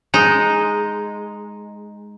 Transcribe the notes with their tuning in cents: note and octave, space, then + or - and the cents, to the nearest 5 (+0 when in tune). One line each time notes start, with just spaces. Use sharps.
G#3 +0 D#4 +0